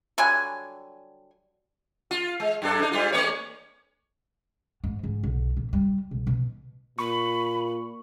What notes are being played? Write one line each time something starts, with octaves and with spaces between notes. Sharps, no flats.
D3 F#3 G3 G#5
F4
G#3
F#2 D4 A4
D4 D#4
G#2 G3 F4
G#3 A3 C#5
G#2
G#2
B1
A#2
G3
B1
B2
A#2 B5 C#6